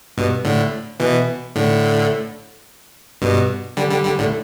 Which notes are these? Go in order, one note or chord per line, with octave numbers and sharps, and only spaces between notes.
G2 B2
A2 D3
B2 E3
A2 D3
G2 B2
D3 G3
D3 G3
D3 G3
A2 D3